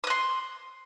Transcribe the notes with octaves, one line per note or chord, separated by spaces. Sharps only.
C6 D#6 F#6